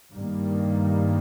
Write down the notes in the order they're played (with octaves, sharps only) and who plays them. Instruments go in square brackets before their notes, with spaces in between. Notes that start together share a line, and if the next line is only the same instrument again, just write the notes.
[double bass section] G2 D#3 G3 A#3